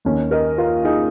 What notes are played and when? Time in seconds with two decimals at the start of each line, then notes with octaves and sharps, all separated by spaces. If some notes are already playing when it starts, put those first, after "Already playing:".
0.05 D#2 D#3 C#4
0.31 A#4 D#5
0.58 F4 A#4
0.85 D#4 G#4